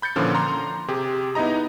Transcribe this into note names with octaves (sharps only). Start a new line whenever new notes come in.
B5 G6 A6 C#7
A#2 D3 E3 F3 C#4
A#5 C6
C3 G4 G#4
B3 D#4 E4 D#5 A#5